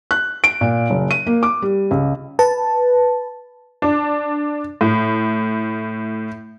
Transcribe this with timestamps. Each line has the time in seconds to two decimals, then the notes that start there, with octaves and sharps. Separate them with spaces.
0.11 F#6
0.44 D7
0.61 A#2
0.90 F#1
1.11 D#7
1.27 A#3
1.43 D6
1.62 G3
1.91 C#2
2.39 B4 A5
3.82 D4
4.81 A2